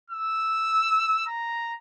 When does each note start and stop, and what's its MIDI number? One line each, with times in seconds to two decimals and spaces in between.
0.10 1.24 88
1.27 1.74 82